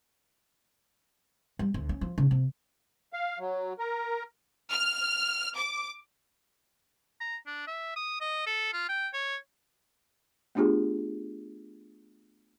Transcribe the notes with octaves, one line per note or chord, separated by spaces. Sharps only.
G3
D2
C#4
F3
C#3
C3
F5
F#3
A#4
F6
D6
A#5
D4
E5
D#6
D#5
A4
F4
G5
C#5
A3 B3 D4 F4 G4 G#4